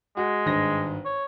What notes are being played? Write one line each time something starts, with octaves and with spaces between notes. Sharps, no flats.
G#3 F#4
G#1 G2 A#6
C#5